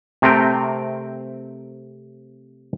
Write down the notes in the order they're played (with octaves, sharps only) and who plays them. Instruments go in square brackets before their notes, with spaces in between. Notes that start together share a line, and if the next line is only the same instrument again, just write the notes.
[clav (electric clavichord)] C3 A3 C4 A#4 G5